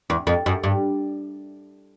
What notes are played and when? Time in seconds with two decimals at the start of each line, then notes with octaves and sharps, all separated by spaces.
0.10 E2
0.27 F2
0.46 F#2
0.63 G2